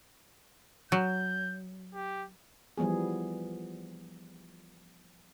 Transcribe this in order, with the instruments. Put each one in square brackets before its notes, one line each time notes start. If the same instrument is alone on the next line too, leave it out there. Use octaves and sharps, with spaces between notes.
[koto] F#3 [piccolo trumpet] G6
[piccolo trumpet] G4
[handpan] E3 F3 G3 B3 G#4